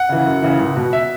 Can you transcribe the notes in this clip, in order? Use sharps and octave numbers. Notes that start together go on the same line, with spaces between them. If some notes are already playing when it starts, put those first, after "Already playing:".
Already playing: F#5
C#3 E3
F#2
C#3 E3
C#2
B2
E5